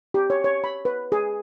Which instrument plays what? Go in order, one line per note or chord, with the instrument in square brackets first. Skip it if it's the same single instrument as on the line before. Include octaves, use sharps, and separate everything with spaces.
[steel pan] G4
C#5
C#5
B5
B4
G#4